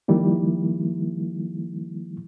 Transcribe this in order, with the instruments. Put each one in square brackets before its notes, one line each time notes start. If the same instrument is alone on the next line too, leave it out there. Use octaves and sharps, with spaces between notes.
[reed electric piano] D#3 F3 G3 A#3 E4